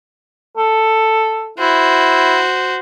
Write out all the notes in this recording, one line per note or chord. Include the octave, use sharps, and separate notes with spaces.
A4
E4 F#4 C5